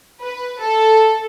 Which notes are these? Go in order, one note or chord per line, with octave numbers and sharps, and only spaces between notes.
B4
A4